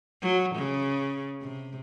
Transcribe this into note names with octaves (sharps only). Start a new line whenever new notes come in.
F#3
C#3
C3